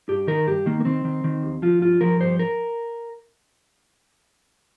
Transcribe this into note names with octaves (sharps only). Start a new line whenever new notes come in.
G2 G4
D#3 A#4
G2 G4
D#3 A#3
A#3
D#3 C4
D#3
D#3
D#2
F3 F4
G2 F4
F3 A#4
G2 C5
A#4